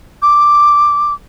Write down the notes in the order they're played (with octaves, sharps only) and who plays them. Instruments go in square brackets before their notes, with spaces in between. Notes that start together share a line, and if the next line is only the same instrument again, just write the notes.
[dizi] D6